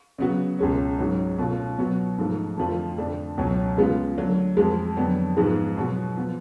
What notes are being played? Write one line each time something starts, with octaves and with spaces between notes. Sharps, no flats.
C#3 F#3 B3 F#4
C#2 B2 G#3 C#4
G#2 F#3 C#4 F#4
B2 A3 C#4 F4
B2 F#3 B3 F#4
G#2 F3 A3
F2 D3 F3 A3 F4
F2 D3 F3 A3 D4
C#2 B2 F#3 C#4
C#3 G#3 B3 F4
D3 F#3 A3
F2 F3 G#3
F2 D3 F#3 B3
G#2 F3 G#3 B3 F4
B2 F#3 B3 F#4
F3 B3